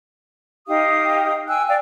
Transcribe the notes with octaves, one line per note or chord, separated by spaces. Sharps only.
D#4 G4 F5 D#6
G5 G#5 E6 F#6
D5 F5 G5